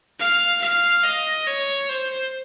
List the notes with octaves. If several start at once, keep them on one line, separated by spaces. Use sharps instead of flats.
F5
F5
D#5
C#5
C5